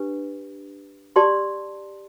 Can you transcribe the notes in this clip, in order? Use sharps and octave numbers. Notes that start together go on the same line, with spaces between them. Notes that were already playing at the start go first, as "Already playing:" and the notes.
Already playing: D4 G4 B4
G4 D5 A5 C6